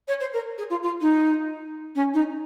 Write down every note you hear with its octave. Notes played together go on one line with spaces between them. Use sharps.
C#5
C5
A#4
G#4
F4
F4
D#4
C#4
D#4